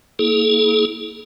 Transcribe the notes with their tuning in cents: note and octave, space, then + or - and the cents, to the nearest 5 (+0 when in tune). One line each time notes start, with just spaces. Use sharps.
A#3 +0 E4 -35 G#4 +45